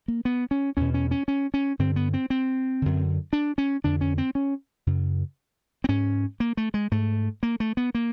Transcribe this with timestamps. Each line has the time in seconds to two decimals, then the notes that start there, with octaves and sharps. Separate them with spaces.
0.08 A#3
0.25 B3
0.51 C#4
0.77 E2 B2 C#4
0.94 C#4
1.11 C#4
1.28 C#4
1.54 C#4
1.79 G2 D3 C4
1.96 B3
2.14 C4
2.30 C4
2.82 F#2 D3
3.33 D4
3.58 C#4
3.84 F2 D3 D4
4.01 C#4
4.18 C4
4.35 C#4
4.87 F#2 C#3
5.84 C4
5.89 G#2 C#4
6.40 A#3
6.57 A3
6.74 G#3
6.91 G#2 A3
7.43 A#3
7.60 A3
7.77 B3
7.95 A#3